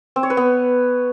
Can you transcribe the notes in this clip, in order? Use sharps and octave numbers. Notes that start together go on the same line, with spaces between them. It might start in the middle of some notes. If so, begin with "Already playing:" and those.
C4
C#5
B4
B3